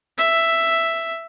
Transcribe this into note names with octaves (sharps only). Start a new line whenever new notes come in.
E5